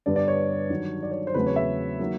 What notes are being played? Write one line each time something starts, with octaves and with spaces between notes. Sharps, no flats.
G2 D3 G3 B3 D5
D5
C#5
G2 D#3 F#3
D5
C#5
C5
E2 C#3 F#3 A3 C4 B4
C#5
E5
D#3 F#3 A#3